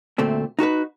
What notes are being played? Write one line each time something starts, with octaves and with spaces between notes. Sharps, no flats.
D2 A#2 A3 C4
D#4 F#4 A4 B4